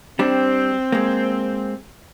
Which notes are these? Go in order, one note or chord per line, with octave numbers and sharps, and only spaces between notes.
G3 C4 D4
G#3 A#3